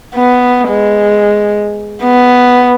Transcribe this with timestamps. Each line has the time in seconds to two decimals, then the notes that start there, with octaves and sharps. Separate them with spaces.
0.15 B3
0.68 G#3
2.03 B3